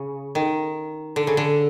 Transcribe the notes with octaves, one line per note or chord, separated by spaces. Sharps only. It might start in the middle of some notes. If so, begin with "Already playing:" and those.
Already playing: C#3
D#3
D3
C#3
D3